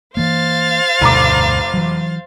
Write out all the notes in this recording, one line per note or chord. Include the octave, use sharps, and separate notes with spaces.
E3 A#3 C5 F5 A6
F1 D2 G2 B2 A#5 D6
E3 F#3